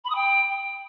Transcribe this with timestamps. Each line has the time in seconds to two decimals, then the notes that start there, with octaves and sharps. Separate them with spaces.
0.04 B5
0.09 D#6
0.15 G5